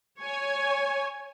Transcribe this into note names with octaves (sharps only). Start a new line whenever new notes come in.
C#5 G#5